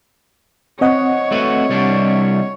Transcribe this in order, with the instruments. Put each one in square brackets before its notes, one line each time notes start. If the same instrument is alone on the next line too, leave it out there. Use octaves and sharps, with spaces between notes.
[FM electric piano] C4 D#5 F#5 [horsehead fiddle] C#5
[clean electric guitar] A3 F#4 B4
C2 G3 D4